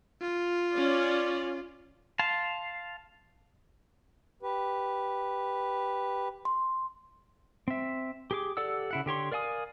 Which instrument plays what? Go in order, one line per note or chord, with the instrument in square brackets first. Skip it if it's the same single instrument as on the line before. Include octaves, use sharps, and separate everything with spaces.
[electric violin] F4
[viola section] C#4 D5
[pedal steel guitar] F5 A5 C6
[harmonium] G4 B4
[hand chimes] C6
[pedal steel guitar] C4 E5
G4 G#4 D6
G4 A4 D5 F#5 E6
C#3 E4 F#5
D3 G4 C#5 C6
A#4 D5 F5 G#5 D#6